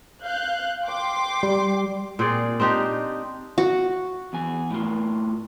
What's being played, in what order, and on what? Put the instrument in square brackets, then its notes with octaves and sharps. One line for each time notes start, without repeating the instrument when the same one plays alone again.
[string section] F5 F#6 G6
G5 C6 D6
[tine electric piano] G3
[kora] A#2 C4 G#4 D5
C4 D4 D#4 G4
[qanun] F#4
[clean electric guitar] E2 G#5
A2 F4